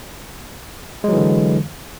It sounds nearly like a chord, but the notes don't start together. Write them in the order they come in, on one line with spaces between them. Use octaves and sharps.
G#3 F#3 E3 D3